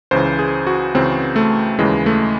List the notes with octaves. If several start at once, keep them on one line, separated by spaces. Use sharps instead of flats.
C#2 C#3 E3 C5
G#4
F#4
C#2 C#3 E3 C4
A3
D#2 C#3 E3 G#3
A3